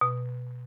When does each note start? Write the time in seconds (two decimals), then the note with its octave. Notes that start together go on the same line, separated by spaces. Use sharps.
0.01 B2